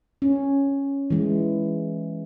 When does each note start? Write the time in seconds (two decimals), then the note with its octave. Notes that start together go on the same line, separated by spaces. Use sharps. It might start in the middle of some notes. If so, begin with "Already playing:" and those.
0.22 C#4
1.10 E3 G#3